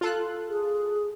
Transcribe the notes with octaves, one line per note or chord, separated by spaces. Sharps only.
F4 A4 F#6
G#4